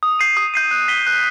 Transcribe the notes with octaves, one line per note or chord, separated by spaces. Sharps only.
D#6
G6 C7 D#7
D#6
G6 C7 D#7
F#6
B6 D#7 G7
F#6